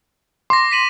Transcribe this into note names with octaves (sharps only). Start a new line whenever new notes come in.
C6 D6 A#6
B6 D#7 F#7